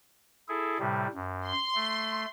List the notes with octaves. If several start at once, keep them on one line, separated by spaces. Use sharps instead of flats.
E4 G#4 A4
A2 C3 G3
F#2
C6
A3